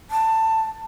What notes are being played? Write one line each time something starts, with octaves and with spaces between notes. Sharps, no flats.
A5